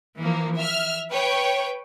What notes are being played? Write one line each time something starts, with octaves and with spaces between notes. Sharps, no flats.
E3 F3 A#3
E5 F6
B4 C#5 G5